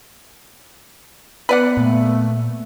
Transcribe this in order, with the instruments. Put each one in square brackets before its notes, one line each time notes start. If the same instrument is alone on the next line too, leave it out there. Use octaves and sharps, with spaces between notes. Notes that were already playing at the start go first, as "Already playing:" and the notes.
[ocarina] B3 [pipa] B4 D5 F#5
[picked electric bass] A#2 [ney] A3